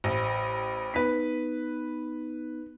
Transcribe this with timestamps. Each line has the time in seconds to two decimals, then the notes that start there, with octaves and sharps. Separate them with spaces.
0.04 A1 C5 B5
0.94 B3 D#4 B4 B6